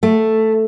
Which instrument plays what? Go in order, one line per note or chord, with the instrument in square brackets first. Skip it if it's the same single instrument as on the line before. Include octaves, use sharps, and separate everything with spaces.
[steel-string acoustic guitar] A3